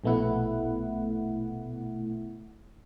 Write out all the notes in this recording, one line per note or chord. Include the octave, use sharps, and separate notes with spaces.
A#1 B2 A3 B3 E4 F#5